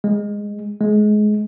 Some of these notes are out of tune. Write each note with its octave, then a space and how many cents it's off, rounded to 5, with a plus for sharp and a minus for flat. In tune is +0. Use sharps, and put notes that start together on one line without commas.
G#3 -10
G#3 +25